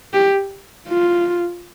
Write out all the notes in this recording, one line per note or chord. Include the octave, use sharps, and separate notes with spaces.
G4
F4